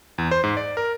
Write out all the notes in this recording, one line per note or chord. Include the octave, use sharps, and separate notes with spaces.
E2
C5
G#2
D5
A#4